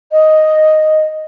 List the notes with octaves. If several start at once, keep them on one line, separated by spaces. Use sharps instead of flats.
D#5